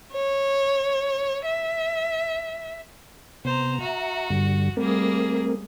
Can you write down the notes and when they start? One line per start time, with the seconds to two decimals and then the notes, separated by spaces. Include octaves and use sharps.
0.11 C#5
1.45 E5
3.45 C3 B3 C5 A#5
3.81 F#4 E5 A#5
4.30 G2 D3 G3
4.77 G3 A3 A#3 C4 G#4 A#4